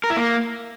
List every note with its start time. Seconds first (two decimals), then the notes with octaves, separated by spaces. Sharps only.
0.04 A#4
0.10 E4
0.17 A#3